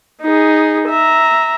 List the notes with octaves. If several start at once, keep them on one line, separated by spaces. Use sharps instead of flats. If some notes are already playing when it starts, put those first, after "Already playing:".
D#4 G#4
E5 A#5